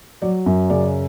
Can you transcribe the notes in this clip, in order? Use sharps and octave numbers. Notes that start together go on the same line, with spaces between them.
F#3 D5
F#2
C#3 D5